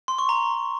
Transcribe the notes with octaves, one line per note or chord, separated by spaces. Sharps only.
C6
C#6
A#5